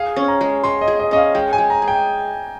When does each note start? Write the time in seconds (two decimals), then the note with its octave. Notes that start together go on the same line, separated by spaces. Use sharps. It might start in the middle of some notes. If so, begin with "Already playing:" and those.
Already playing: G#4 F5
0.16 C#4
0.28 A#5
0.41 G#3
0.64 G#3 C6
0.81 D#5
0.88 G#4
1.00 D#5
1.11 C#4 D#5
1.17 F5
1.35 G#3 G5
1.53 G#5
1.58 G#3
1.70 A#5
1.82 G#4
1.88 G5